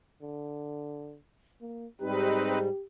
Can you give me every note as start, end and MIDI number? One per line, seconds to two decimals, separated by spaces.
0.22 1.18 50
1.61 1.86 58
2.01 2.69 44
2.01 2.69 55
2.01 2.59 60
2.01 2.59 63
2.01 2.84 67
2.01 2.59 71